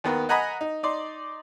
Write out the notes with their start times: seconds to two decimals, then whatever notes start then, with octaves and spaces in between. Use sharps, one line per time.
0.04 D#2 B3 A#4
0.29 D#5 F#5 G#5 A#5 B5 D#6
0.61 D#4
0.83 D#4 D5 C6